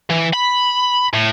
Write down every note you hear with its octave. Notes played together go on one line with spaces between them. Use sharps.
E3
B5
A2